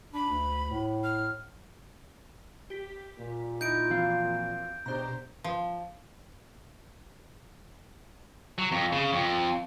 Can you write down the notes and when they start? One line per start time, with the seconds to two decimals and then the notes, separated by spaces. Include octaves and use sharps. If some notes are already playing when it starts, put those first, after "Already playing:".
0.14 D4 B5
0.29 D2
0.70 A2
1.04 F6
2.70 G4 B6
3.19 A#2
3.61 D#4 E4 G6 D7
3.90 E3 F3 C4 F#4 F5
4.86 B2 D4 G4 C5 A#5
5.44 F3
8.58 F#3
8.72 F2
8.92 C#3
9.12 F2